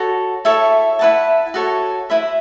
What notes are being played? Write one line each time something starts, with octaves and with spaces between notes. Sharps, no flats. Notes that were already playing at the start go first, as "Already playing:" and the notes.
Already playing: F#4 A4 C#5
E4 A4 C#5 E5
E4 B4 F#5 A5
F#4 A4 C#5
E4 B4 E5 B5